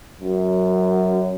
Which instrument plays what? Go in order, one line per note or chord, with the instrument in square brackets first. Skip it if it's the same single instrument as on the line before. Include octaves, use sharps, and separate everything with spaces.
[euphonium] F#2